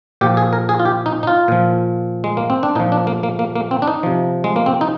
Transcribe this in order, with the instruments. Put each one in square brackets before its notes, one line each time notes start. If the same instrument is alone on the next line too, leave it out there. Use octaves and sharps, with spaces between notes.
[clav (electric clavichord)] A#2 F3 G4
G#4
A#4
G#4
F4
G4
D#4
D#4
F4
A#2 F3
G#3
A#3
C4
D4
A#2 D#4
F3
D4
A#3
A#3
A#3
A#3
C4
D4
D#4
C3 F3
G#3
A#3
C4
D#4